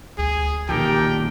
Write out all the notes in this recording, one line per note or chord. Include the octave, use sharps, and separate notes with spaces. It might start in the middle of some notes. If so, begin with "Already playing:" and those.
D2 G#4
B1 A#2 D#3 F3 G4 A4 A#4 G5